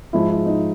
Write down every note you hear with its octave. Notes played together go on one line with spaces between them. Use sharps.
G#2 F3 G#3 E4
E4
D#4